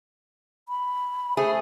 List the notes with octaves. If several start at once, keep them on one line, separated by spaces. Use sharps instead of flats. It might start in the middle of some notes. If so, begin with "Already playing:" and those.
B5
A3 G#4 C5